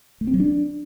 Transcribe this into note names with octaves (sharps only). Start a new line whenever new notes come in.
A3
C4
F#3
D4